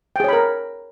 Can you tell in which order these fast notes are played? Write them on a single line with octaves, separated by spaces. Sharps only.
G5 G#4 C#5 B5 A#4